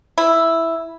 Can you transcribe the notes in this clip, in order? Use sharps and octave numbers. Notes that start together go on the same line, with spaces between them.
E4